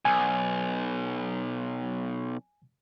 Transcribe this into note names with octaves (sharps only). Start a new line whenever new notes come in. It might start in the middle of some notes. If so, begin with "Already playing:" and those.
B1 G#5